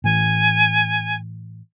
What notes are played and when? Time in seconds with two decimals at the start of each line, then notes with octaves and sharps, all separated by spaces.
0.04 A2 E3 G#5